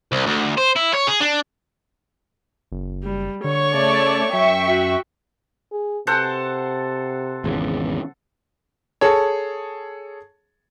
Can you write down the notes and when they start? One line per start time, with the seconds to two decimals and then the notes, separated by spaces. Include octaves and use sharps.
0.12 C2
0.26 D2
0.57 C5
0.76 E4
0.94 C#5
1.07 G#4
1.20 D4
2.72 F#1
3.03 G3
3.44 D3 C#5 C#6
3.74 C#3 A3 D5
4.33 F#2 E5 G5 C#6
4.67 F#4
5.72 G#4
6.07 C3 A4 C5 F#5
7.44 G#1 E2 C#3
9.01 G#4 A4 C#5